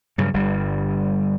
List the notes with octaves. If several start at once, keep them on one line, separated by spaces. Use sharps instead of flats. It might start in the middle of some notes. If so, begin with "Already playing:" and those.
G2 C#3 F#3
G1 G2 G3